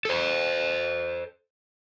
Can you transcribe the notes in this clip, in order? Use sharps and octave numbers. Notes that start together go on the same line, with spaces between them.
A4 C5